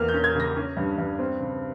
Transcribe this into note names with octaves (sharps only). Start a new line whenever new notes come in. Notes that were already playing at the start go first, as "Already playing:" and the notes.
Already playing: E2 A#3 F6
G6
C#4
G#6
C#3 A#6
C#4
G2
G2
C4
C#3